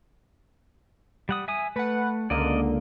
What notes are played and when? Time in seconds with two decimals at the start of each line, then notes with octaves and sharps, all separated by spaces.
1.29 G3 F#5 D#6
1.48 E5 G#5 D#6
1.76 A3 B4 F#5
2.30 C#2 D3 A#3 D5 D#5